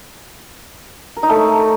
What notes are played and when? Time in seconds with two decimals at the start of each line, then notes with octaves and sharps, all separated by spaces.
1.17 A#4
1.23 D#4
1.29 A3
1.36 C#5